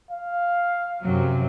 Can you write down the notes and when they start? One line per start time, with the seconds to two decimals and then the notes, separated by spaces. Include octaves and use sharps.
0.11 F5
1.02 F#2 C3 F#3